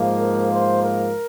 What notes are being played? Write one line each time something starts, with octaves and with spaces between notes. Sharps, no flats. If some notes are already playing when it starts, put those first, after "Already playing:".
Already playing: G#2 F3 A#3
A#4
C5
A#4